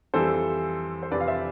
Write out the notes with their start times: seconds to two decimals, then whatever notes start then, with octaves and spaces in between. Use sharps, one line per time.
0.14 F2 E3 G3 A4 C5
1.03 C5
1.11 F2 C3 E3 B4 D5
1.21 F5
1.28 C5 E5